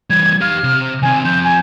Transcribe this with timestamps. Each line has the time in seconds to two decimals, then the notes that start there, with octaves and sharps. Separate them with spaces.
0.10 E3 G3 G#6
0.41 G4 F5 F6
0.64 C3
1.02 D#3 C4 G#5
1.24 F3 C4 G6
1.44 G#5